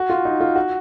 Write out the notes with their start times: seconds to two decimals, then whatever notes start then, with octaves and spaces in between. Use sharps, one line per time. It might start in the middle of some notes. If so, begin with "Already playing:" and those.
Already playing: F#4
0.10 F4
0.25 D#4
0.41 F4
0.56 F#4